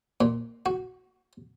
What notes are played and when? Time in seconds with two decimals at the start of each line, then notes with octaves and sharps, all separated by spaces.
0.21 A#2
0.66 F#4